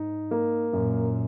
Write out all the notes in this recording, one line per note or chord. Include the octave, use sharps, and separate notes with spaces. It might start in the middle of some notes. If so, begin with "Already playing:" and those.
Already playing: G#2 D#4
A#3
F#2 A#2